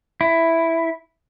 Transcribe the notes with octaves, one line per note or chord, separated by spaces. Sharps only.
E4